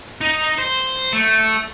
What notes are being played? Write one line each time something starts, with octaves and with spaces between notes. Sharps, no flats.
D#4
C5
A3